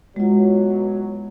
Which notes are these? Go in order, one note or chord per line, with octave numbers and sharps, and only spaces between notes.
B2 E3 F#3 G#3 F4